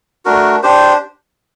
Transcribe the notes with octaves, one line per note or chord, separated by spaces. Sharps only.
A3 D4 F#4 A#4
D4 G4 C5